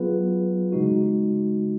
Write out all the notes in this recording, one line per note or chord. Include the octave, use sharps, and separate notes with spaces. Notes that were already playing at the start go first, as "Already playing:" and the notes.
Already playing: F#3 B3 F4 G#4 B4
C#3 G#3 D#4 F#4